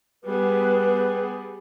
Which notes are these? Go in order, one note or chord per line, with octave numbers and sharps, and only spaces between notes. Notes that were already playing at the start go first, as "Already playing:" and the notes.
G3 B3 G#4 B4